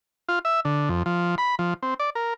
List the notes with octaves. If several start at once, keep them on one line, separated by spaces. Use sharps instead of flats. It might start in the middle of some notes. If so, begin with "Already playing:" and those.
F4
E5
D3
F2
F3
B5
F3
C4
D5
A#4